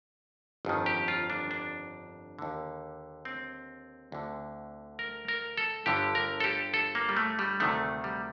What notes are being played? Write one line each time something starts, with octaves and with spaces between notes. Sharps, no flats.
G1 F2 D#3
G4
F4
D4
D4
D#2 D3
C4
D2 D3
A#4
A#4
A4
G1 G2 D3 G4
A#4
A4
G4
A4
A#3
G3
A3
G3
D2 C3 D#3 A3
G3